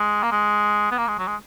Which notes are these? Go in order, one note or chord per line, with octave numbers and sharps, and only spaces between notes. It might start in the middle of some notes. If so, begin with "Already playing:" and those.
Already playing: G#3
A#3
G#3
B3
A#3
G#3
F#3
G#3